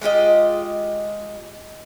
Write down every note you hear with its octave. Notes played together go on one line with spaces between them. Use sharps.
G#3 F4 G4 D#5